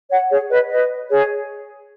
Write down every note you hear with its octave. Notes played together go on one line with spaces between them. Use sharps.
C#5 F#5
G#4 C#5
B4 D#5
B4 D#5
G#4 C#5